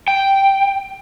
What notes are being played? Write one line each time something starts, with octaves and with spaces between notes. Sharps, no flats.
G5